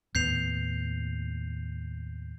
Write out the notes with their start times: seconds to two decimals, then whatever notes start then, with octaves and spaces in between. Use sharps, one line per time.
0.15 D#2 A2 B3 G6 C7 F7